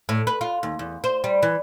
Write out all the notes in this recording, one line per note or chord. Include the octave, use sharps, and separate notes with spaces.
A2
B4
F4
D#2
E2
C5
G3
E3